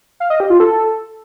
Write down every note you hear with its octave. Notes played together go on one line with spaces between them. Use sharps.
F5
D#5
G4
F4
A4